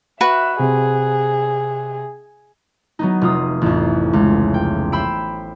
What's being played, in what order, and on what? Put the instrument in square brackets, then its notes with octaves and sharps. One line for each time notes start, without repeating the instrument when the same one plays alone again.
[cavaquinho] F#4 B4 [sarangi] E5
[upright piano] C3 [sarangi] G#4
[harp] F#3 B3 D#4
F1 F4 D#6
A1 F2
C#2
G5
C5 B5 E6 D7